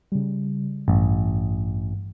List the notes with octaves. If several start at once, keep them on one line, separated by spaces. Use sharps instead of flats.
C#3 G3
A1 G2